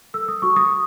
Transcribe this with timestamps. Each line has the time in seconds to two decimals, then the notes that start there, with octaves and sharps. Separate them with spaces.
0.14 A4 E6
0.28 D#6
0.42 F#4 C#6
0.56 D#6